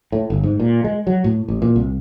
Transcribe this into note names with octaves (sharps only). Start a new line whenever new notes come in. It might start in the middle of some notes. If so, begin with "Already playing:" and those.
A2
G1
G#2
A#2
G#3
F#3
A2
A1
A#2
C2